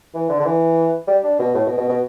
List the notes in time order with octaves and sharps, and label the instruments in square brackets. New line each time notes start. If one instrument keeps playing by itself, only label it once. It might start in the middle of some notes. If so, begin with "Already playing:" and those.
[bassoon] E3
D3
D3
E3
G3
D4
B2
A2
B2
B2
B2